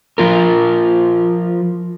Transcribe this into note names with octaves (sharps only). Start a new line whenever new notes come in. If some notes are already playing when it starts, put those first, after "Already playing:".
F3 F4 A#4